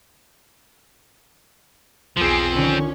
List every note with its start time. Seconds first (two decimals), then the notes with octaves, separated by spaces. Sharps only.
2.17 B1 E2 F3 C4 F4 G#4
2.54 D3 D#3 C#4